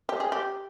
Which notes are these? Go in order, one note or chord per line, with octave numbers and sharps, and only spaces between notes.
G4
G#4
G4